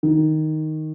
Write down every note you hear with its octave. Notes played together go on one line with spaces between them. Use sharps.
D#3